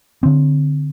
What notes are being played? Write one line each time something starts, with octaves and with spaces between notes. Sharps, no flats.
D3 C4